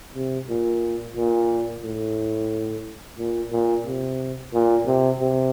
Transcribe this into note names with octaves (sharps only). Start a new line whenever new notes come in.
C3
A#2
A#2
A2
A#2
A#2
C3
A#2
C3
C3